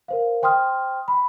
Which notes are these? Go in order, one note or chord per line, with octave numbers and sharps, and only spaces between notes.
A#4 C5 F5
C5 G5 C6 D#6 F6
B5